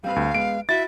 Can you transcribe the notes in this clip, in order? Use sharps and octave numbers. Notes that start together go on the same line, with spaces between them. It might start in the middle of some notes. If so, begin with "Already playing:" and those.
G3 C4 B4 F5
D2
G#3 B3 D7
E4 F#4 E5 A6